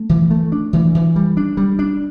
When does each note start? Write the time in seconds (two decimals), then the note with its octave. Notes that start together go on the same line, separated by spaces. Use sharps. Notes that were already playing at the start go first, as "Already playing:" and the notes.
Already playing: A3
0.09 E3
0.31 A3
0.52 D4
0.73 E3
0.95 E3
1.16 G3
1.37 D4
1.57 G3
1.79 D4